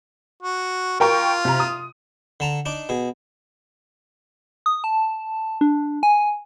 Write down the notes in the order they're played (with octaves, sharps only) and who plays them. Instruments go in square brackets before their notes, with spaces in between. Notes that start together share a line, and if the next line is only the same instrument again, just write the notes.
[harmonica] F#4
[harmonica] F4 [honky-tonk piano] A#4 G5 C#6
[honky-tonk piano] C3 A#5
D#6
[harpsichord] D3 A5 A#5
D4 D#4 D5
B2 G#4
[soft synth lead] D#6
A5
D4
G#5